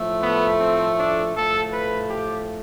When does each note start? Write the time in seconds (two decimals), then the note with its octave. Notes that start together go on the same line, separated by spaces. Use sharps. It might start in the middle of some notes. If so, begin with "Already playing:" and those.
Already playing: A2 F3 A3
0.22 B3
0.60 C4
0.97 D4
1.35 A2 F3 A3 A4
1.72 B4
2.10 G4